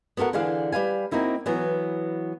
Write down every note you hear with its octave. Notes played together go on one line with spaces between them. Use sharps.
B3 F#4 A4 A#4 F#5
D3 E3 G#4 D5 F5
G3 B4 F5 G#5
A#3 C4 D#4 E4 F#4
E3 F#3 B3